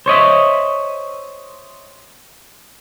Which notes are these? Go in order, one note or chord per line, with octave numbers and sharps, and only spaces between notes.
C5 C#5 D#5 E5